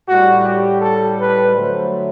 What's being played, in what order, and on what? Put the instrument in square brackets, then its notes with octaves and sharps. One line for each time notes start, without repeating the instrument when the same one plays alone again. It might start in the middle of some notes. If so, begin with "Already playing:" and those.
[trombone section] A2 G3 F#4
G4
A4
B4
D3 F#3 A3 C5